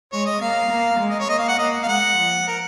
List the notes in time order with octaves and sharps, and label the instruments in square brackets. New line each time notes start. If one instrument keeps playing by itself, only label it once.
[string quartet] G#3 [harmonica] C#5
[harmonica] D#5
[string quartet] A#3 [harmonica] F5
[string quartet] A#3
G#3
[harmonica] D#5
C#5
[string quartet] A#3 [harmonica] D#5
[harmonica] F5
F#5
[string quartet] A#3 [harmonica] D#5
[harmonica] F5
[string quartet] G#3 [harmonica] F#5
[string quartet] F3
[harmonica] A#4